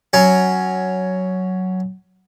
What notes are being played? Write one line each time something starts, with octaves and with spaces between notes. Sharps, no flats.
F#3 C#4